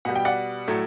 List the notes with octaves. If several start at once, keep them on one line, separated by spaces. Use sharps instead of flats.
B2 G3 F#5
G5
D5 F#5
A2 F#3 A3